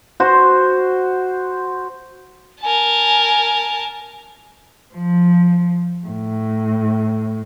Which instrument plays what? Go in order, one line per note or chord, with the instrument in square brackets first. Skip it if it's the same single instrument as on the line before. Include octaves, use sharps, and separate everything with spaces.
[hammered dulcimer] F#4 C5
[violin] A#4 A5 [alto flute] G#5
[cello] F3
A2